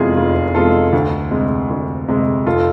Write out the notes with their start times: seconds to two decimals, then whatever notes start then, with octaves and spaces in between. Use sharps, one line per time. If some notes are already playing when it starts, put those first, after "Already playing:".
Already playing: F1 E2 C3 G#3 E4 F4 G#4
0.17 F1 F4
0.55 E2 C3 G#3 F4 A4
0.93 D2
1.31 C3 G#3
1.70 D2
2.08 C3 G#3
2.46 F1 F4 A4